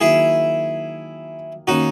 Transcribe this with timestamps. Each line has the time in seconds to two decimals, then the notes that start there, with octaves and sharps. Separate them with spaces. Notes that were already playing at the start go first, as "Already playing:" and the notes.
0.01 D#3 F#3 A#3 E4 G#4
1.67 D#3 A#3 C#4 D#4 F#4